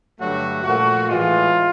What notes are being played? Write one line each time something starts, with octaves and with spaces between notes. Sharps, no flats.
G2 D3 F#3 A3 F#4
A#2 F3 A3 F#4
A2 E3 G#3 F4